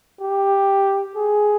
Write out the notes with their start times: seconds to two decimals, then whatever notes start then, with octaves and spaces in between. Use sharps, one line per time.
0.21 G4
1.16 G#4